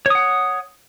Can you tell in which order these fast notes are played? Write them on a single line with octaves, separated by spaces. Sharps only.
C#5 D#6 F#5